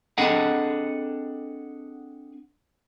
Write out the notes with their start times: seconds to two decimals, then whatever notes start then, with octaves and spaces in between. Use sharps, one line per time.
0.18 C4 D4 G#4 A4 D#5 F#5